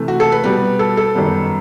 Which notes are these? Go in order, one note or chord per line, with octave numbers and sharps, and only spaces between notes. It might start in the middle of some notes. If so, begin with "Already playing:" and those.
Already playing: C3 E3 A3
F#4
A4
B4
B2 G3 B3 B4
A4
A4
F#2 D#3 G3 B3